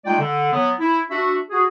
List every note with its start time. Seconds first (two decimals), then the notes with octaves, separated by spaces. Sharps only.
0.05 G#3 A3 D#4 F4 D5 G5
0.19 D3
0.53 F#3 B3
0.80 E4
1.10 D4 F#4 E5
1.50 F#4 G#4